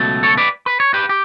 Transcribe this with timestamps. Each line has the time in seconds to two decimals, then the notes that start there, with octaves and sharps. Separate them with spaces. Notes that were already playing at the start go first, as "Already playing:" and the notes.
Already playing: C#2 B2 F#3 A3
0.23 A4 C#5
0.37 B4 D5
0.66 B4
0.80 C#5
0.94 G4 B4
1.09 G4